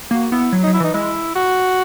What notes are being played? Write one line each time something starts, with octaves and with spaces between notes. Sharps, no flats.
A#3 F#4
B3 E4
F#3
F#3 D#4
E4
E3 D#4
G#3 E4
F#4